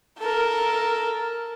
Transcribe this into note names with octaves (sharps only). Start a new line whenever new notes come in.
A4 A#4